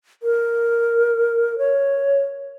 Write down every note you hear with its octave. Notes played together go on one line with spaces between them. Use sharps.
A#4
C#5